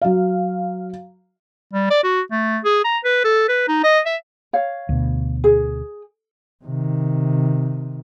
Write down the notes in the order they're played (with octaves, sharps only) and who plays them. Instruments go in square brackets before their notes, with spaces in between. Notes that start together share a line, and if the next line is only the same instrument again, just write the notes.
[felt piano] F#3 F5
[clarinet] G3
D5
F#4
A3
G#4
A#5
B4
A4
B4
D#4
D#5
E5
[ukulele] C#5 F5
[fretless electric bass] D2 B2
[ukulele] G#4
[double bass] C3 D#3